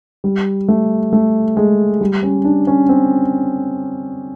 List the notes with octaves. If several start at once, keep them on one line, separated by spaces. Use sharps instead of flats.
G3
A3
A3
G#3
G3
C#4
D4
C#4
C4